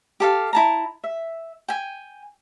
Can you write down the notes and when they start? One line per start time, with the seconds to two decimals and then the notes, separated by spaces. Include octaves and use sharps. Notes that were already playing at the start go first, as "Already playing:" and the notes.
0.20 G4 A4 F5
0.53 E4 A5 A#5
1.04 E5
1.68 G5 G#5